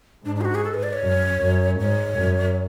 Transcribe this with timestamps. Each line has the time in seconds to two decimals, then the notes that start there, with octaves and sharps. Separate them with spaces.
0.25 G#2 D4
0.36 D4
0.41 G#4
0.45 F#4
0.55 G#4
0.64 A4
0.74 B4
0.83 D5
0.93 C#5
1.03 F#2
1.41 F#2
1.79 G#2 C#5
2.18 F#2